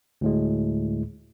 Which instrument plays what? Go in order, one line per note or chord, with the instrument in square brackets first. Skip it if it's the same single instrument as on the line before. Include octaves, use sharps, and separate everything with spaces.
[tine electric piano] D2 A2 G#3